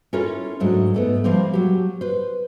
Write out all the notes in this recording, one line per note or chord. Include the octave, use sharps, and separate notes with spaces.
C#4 E4 F4 A4 A#4 C#5
G#2 F#3 A3 D4
G#2 A3 B3
F3 G3 A#3 C4
F#3 G4
B4 C5